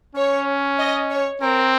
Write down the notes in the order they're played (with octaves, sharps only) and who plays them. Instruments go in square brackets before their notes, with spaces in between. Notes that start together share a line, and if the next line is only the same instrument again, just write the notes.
[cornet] C#4 [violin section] C#5
[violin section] D#5
C#5
[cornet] C4 [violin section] A#4